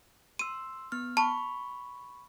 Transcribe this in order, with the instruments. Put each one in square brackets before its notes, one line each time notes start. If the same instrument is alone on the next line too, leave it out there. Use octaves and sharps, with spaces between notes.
[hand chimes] C6 E6 [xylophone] D#7
[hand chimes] B3 F6
[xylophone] A5 [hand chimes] B5 C#6